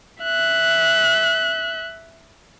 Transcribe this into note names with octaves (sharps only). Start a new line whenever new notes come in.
E5 F#6